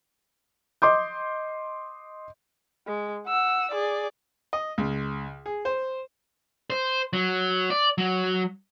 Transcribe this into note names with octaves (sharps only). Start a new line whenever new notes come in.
D#5 C6 D6 G6
G#3
F#5 E6
G#4 D5
D#5
C#2
G#4
C5
C5
F#3
D5
F#3